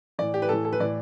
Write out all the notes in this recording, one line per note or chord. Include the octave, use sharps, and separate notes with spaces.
A2 E3 D5
G4
B4
A2 E3 A4
A4
B4
A2 E3 D5